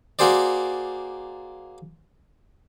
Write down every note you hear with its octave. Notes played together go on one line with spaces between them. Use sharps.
A#3 F#4 G#4 C5 D5